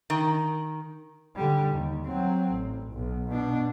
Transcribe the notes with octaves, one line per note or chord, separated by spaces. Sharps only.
D#3
D3 G3
D#2
F#3 C4
A1
B1
B2 D4